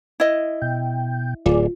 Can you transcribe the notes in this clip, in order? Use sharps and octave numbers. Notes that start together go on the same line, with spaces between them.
E4 D#5
B2 G5
D1 F4 G#4 D5